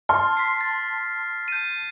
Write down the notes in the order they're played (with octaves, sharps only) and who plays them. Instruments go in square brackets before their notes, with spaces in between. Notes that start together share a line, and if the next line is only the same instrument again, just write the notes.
[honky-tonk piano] A5 C6 [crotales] F6
[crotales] B6 C7
A6
G6 D#7